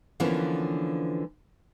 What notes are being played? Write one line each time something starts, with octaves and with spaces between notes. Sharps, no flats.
D3 E3 F3 A#3 B3 C#4